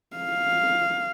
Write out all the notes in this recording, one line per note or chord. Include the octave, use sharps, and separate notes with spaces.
F5